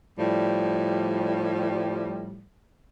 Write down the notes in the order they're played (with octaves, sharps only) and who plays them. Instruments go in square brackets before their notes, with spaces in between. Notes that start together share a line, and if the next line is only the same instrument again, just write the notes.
[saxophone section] A2 F3 G3